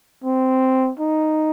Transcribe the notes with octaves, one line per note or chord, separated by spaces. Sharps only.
C4
D#4